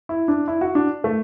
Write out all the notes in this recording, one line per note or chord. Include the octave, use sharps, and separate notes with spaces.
E4
D4
E4
F#4
D4
A3